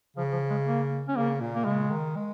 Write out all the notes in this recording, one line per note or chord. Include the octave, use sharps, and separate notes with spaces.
C#3 F3
F3
G#3
A#3
C#4
C#3 A#3
A#2
A#3
C#3 G#3
D#3
G#3